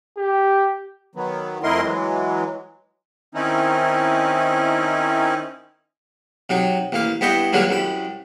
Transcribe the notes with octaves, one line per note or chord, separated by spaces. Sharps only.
G4
D#3 F#3 B3
F2 A3 E4 A#4 D#5 C6
E3 F#3 G#3
D#3 C4 C#4 D#4 E4
C3 F#3 D#4
A1 A#3 F5
G2 B3 E4 D#5 G5 C#6
G2 D3 F#3 G#3 A#3 F4
C2 F#2 B5